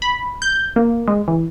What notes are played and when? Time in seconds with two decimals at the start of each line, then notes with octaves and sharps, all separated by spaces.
0.02 B5
0.42 G6
0.76 A#3
1.08 G#3
1.28 E3